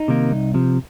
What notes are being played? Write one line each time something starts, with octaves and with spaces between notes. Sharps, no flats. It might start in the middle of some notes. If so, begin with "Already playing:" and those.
Already playing: D#4
C3 D#3 A#3
C2
C3 F3